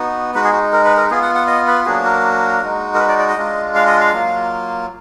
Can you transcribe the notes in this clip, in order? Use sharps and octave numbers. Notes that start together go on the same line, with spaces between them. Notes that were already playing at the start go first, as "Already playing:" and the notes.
Already playing: B3 D#4 F#4
G#3 D#4 F#4 B4
G#4
F#4
A#4
B4
A#4
B3 F4 G#4
F#5
F#5
D#5
B4
F#3 A#3 D4 F#4 G#4
A#4
G#3 D#4 F#4
A#4
B4
D5
D5
D#5
G#3 D4 F4
F5
D#5
F5
F#3 A#3 F4